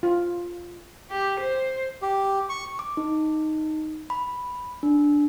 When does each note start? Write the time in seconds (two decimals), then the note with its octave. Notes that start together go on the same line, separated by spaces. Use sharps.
0.03 F4
1.10 G4
1.40 C5
2.02 G4
2.49 C#6
2.79 D6
2.97 D#4
4.10 B5
4.83 D4